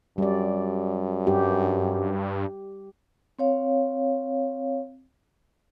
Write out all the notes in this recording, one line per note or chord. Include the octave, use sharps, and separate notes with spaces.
F#2 G3 D5
G2 G4
C4 C#5 F5